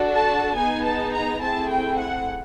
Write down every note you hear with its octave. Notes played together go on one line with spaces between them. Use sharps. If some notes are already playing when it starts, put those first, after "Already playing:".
Already playing: D4 F#4 A4
A5
B3 D#4 G#4 G#5
A5
A#5
A3 C4 E4 G#4 A5
G5
F#5